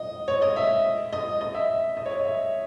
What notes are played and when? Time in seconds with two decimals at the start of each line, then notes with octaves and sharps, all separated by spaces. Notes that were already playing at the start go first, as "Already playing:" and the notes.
Already playing: D#5
0.28 C#5
0.42 D#5
0.56 E5
1.13 D#5
1.41 D#5
1.55 E5
1.97 D#5
2.06 C#5
2.15 D#5
2.25 E5